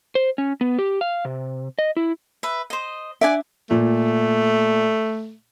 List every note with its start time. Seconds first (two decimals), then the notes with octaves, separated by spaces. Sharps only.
0.15 C5
0.38 C#4
0.61 B3
0.79 G4
1.01 F5
1.25 C3
1.79 D#5
1.97 E4
2.43 B4 E5
2.70 C5 D#5
3.21 D4 D5 E5 F#5 G#5
3.71 A#2 A3